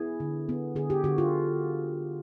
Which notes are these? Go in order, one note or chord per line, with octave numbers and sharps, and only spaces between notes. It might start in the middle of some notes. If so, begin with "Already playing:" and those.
Already playing: B3 E4 G#4
D3
B3
D3 G#4
G4
D3 F#4
F4